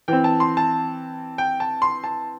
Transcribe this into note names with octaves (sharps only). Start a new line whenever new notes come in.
E3 C4 G5
A5
C6
A5
G5
A5
C6
A5